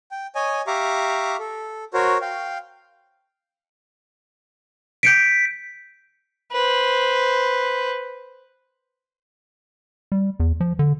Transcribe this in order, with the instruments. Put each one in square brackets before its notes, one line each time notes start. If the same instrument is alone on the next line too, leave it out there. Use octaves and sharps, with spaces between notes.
[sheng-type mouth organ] G5
C#5 D#5 G#5
G4 E5 F5 A#5 C#6 D6
A4
F#4 A#4 C5 C#5
F5 G5
[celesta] G6 C#7 D7 [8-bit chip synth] B6
[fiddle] B4 C5
[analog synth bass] G3
E2
F3
D3